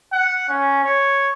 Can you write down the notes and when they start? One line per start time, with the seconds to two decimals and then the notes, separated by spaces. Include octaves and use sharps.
0.13 F#5
0.49 C#4
0.84 C#5